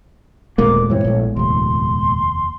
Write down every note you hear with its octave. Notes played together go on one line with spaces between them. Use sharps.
D#1 D2 A#2 G#3 A#3 B3 D6
G2 E3 C4 C#5
A#1 A2
F1 D#2 C6